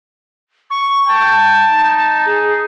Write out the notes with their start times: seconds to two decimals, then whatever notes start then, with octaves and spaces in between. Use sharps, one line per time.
0.70 C#6
1.08 G5 A5
1.70 D#4
2.25 G#4